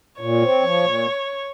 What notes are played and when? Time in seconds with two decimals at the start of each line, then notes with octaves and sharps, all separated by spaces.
0.21 A#2 C#5
0.42 C4
0.62 F3
0.84 A#2